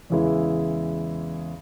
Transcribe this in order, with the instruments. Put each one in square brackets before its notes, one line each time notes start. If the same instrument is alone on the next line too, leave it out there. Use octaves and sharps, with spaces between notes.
[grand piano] E2 C#3 E3 G#3 E4